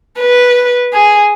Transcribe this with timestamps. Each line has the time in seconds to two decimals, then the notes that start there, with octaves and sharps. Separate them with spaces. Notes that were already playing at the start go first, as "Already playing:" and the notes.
0.20 B4
0.93 G#4